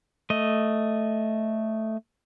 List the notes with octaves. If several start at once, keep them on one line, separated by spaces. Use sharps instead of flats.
A3 D#5